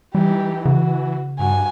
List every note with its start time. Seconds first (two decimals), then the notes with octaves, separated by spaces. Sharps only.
0.15 E3 G3 D#4 G4
0.65 C#3 F#4
1.39 G2 F#4 G#5